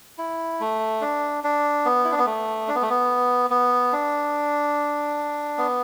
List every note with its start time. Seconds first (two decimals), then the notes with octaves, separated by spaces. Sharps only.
0.18 E4
0.60 A3
1.01 D4
1.44 D4
1.85 B3
2.04 E4
2.12 D4
2.19 B3
2.26 A3
2.68 D4
2.75 B3
2.82 A3
2.90 B3
3.50 B3
3.93 D4
5.58 B3